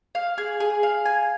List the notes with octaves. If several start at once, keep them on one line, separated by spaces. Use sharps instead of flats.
F5
G#4
G#4
F5
G#5